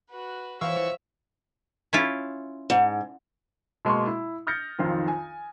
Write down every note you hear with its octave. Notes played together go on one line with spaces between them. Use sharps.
F#4 B4
E3 F3 F#4 C#5 E5 F5 C#6 E6
C#4 E4 F4
G#2
B2 G#3 A#3 C6 C#6
E4
D#6 F6 G6 A6 A#6 C#7
B1 F2 D#3 C4 F4
G#5